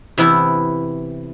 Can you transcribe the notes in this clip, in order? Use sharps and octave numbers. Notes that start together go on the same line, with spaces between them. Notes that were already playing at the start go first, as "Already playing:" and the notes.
C3 E3 B3 E4